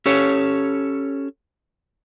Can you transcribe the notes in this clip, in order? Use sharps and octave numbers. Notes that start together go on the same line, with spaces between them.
C#4 G4 A4 C#5